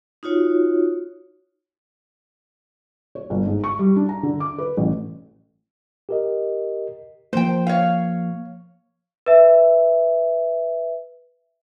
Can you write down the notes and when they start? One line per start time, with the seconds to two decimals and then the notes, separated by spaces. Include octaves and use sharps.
0.23 D#4 F4 F#4 C#5
3.15 C#5
3.30 G1
3.46 G#2
3.64 C#6
3.79 G3
3.96 D4
4.09 A#5
4.23 D3
4.40 D6
4.58 B4
4.77 A1
6.09 G4 A#4 D#5
7.33 F3 A#3 C5 G5
7.67 C#5 F5
9.26 B4 E5